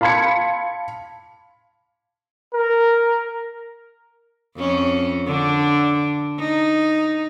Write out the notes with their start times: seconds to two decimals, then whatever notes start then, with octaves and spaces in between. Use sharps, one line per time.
0.01 F5 A5 B5 C6 G#6 C#7
2.54 A#4
4.57 F2 C#4
5.27 D3 D4
6.39 D#4